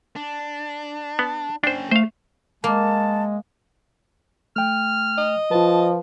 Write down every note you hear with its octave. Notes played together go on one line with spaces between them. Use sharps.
D4
B3
C#4 D4 C5 G5
A3 C5 F5
G#3 A#3 A5
A3 G5 F6
D#5
F3 F4 B4 A5